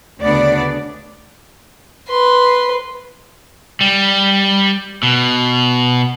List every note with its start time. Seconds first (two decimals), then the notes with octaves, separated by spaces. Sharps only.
0.20 D2 C#3 B3 D4 D5
2.08 B4 C6
3.81 G3
5.03 B2